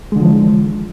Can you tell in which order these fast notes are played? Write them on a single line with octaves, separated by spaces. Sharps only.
G#3 D3 F3 E3